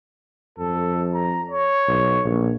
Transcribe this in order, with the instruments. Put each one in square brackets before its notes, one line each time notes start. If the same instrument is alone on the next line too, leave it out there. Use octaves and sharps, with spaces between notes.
[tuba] F2 [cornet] A4
[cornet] A#5
C#5
[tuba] B1
A#1